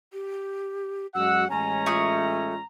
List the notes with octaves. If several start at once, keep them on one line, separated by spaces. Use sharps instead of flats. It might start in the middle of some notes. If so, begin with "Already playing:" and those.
G4
F#2 G#3 F#4 F#5 E6
A1 G#3 C#4 G#5 A#5
A3 F4 C#6 D#6